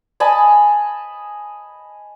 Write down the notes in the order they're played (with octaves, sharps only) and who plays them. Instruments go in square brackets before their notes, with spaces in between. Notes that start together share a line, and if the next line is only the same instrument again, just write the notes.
[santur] D#5 G#5 A5 B5